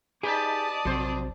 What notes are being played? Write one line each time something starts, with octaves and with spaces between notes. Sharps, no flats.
D#4 G4 G#4 B4 D5 A5 D#6
A#1 F2 C3 F#3 C5